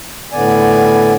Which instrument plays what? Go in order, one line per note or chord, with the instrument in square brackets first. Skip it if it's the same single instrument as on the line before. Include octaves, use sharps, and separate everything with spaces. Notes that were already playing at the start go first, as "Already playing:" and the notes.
[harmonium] A2 D3 B3 D5 G#5